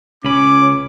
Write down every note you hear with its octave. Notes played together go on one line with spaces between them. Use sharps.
C#2 C#4 C#5 B5 D6